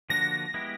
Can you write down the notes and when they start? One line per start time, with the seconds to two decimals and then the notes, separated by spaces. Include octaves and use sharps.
0.10 D3 F3 A#3 D4 F#4 A#6
0.54 G#3 B3 E4 G4